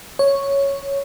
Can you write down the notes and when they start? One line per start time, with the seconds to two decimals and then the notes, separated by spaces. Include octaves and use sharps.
0.19 C#5